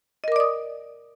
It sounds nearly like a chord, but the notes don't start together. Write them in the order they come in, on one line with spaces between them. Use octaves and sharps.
D#5 A#4 D6 D5 D#6